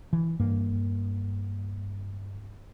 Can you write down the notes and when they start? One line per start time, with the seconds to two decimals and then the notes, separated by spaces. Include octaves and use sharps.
0.13 E3
0.39 G2 A#3